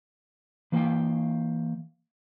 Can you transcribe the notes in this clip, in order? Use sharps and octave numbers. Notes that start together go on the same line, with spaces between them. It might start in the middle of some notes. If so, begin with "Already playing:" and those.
E3 A#3 B4 D#5 F5 G5